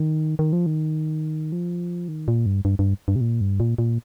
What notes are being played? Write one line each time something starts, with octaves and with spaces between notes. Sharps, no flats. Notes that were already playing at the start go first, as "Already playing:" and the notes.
Already playing: D#3
D#3
F3
D#3
F3
D#3
A#2
G2
G2
G2
G2
C3
A#2
G2
A#2
A#2